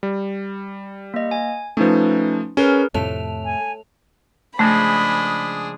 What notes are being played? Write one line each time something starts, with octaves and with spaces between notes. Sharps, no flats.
G3
A#3 D#5
G#5
F3 A3 C#4 D#4 B4
C#4 G#4 A#4 B4
F2 A2 C3 A3 C#5 A5 F7
G#5
C#3 F3 G#3 A3 D4 G#4 B5